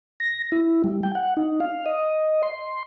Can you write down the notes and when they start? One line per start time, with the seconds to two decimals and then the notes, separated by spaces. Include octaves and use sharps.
0.20 A#6
0.52 E4
0.84 G3
1.03 G5
1.15 F#5
1.37 D#4
1.60 F5
1.86 D#5
2.43 C6